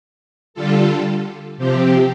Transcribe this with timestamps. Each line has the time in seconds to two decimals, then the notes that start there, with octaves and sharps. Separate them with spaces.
0.54 D3 G3 F4 A4
1.57 C3 F3 C4 G4